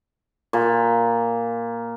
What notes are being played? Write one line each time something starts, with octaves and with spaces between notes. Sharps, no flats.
A#2